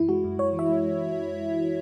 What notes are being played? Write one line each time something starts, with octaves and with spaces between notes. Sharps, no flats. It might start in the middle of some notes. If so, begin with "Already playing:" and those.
Already playing: F#2 E3 E4
G#3 F#4
F#2
F#2 C#5
E3
E5
G#3